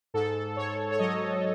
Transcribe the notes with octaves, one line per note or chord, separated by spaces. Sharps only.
G#2 A4
G#2 C#5
C#5
F#3 D#5